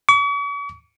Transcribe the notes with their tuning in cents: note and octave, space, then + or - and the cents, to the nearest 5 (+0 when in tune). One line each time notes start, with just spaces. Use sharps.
C#6 +45